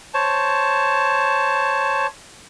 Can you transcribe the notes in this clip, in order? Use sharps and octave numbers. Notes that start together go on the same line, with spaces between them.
C5 C#5 A5